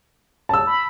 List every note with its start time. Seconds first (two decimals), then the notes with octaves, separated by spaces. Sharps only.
0.49 A5 E6
0.67 B5